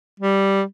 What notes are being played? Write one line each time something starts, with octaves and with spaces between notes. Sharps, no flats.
G3